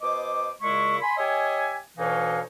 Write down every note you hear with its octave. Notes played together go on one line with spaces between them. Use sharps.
B2 C5 D#5 D6
A#2 C#3 G#3 E4 C#6
G#5 B5 C6
G4 C#5 D#5 E5 G#5
D2 B2 E3 D#4 C#5 F5